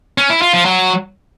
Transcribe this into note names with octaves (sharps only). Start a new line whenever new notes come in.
C#4
E4
F4
F3
F#3